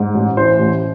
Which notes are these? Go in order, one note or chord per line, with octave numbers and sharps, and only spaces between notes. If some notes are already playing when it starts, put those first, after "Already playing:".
Already playing: G#2
A1
E3 C5
A1